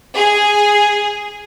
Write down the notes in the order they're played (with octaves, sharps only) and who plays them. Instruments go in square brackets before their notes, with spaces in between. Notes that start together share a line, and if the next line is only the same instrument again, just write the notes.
[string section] G#4